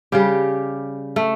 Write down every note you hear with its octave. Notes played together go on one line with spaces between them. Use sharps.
C#3 G3 G4
A3